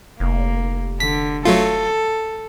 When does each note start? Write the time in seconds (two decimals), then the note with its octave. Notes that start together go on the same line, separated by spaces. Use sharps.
0.20 F1 A#3
1.00 D3 B6
1.45 F#3 A3 F4 A4